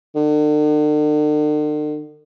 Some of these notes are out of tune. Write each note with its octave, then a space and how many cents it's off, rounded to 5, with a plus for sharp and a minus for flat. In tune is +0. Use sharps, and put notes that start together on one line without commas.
D3 +45